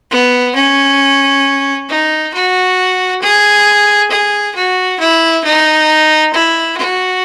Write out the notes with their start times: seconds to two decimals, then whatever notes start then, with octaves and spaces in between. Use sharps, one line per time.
0.11 B3
0.55 C#4
1.89 D#4
2.34 F#4
3.22 G#4
4.11 G#4
4.55 F#4
5.00 E4
5.44 D#4
6.33 E4
6.77 F#4